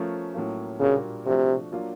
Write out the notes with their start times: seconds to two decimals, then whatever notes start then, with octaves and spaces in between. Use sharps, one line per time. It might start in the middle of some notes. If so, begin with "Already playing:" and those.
Already playing: F3 A3 C#4 F4 A#4
0.34 A2 F#3 A#3 C#4 F4
0.80 A#2 C#3 G3 A#3 D4 F#4
1.26 C3 F3 A3 D4 F#4
1.72 F#3 A#3 D4 F4